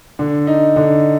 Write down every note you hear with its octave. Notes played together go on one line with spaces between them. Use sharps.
D3
D#4
D3